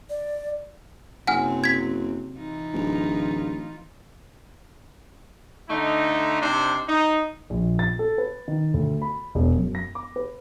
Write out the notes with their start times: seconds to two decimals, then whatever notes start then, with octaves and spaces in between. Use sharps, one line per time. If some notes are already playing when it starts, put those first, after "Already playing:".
0.10 D5
1.27 F#1 C3 F#3 C4 F#5 G#5 F6
1.64 G#6 B6
2.38 E3 D#4 F4
2.73 D1
5.69 D3 A3 D#4
6.42 C3 D4 D#4 C5
6.88 D#4
7.50 A#1
7.79 A6
7.99 A4
8.18 B4
8.48 D#3
8.74 D2
9.02 B5
9.35 E1
9.56 F#2
9.75 A#6
9.95 D6
10.16 B4